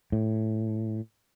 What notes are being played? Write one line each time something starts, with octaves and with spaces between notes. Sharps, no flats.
A2